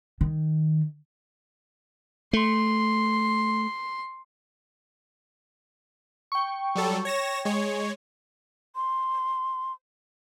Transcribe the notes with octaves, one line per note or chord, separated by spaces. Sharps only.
D#3
A3 C6
G5 C#6
F#3 G3 A4
C#5 A#6 E7
G#3 C#5
C6